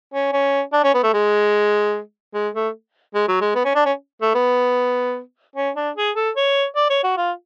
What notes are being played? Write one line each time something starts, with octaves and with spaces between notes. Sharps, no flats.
C#4
C#4
D4
C#4
B3
A3
G#3
G#3
A3
G#3
F#3
G#3
B3
C#4
D4
C#4
A3
B3
C#4
D4
G#4
A4
C#5
D5
C#5
F#4
F4